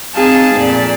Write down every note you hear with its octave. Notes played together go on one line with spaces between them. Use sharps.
C4 D#4 G#4 F5 A5
F2 A#2 D5